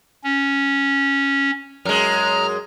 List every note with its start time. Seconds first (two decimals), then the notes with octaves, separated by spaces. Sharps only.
0.24 C#4
1.85 F#2 G#3 A#5 F6